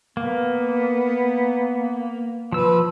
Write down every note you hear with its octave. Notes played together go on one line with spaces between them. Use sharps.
A#3 B3
F3 B4 E6